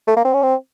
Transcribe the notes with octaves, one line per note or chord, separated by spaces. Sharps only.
A3
A#3
C4
C#4
C4